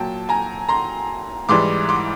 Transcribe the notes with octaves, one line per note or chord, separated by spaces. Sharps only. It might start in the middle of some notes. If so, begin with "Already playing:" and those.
Already playing: A#2 F#3 G5 A5
G#5 A#5
A#5 C6
G#2 E3 G3 C6 D6
C6 D6